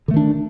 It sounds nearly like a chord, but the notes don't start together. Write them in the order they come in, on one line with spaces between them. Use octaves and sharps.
D3 A3 D#3 D4